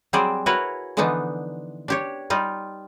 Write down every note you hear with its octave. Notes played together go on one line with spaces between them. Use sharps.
F#3 G3 C4 G#4 C5 D5
E4 F#4 A#4 B4 C#5
D3 E3 F3 B3 D4 D#4
D4 G4 C#5
G3 D#4 F4